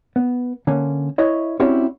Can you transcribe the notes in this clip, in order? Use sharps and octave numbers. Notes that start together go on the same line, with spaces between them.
B3
D3 A#3 C#4
E4 C#5 D#5
C4 C#4 E4 F#4 G4 D5